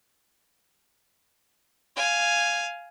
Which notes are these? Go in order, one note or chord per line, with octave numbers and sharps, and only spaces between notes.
F5 G#5